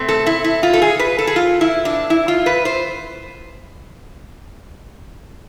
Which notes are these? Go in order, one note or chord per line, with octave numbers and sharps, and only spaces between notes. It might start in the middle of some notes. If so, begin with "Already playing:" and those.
Already playing: B2 A3 C4
A4
E4
E4
F4
A4
G#4
B4
A4
G#4
F4
E4
D4
E4
F4
B4
C5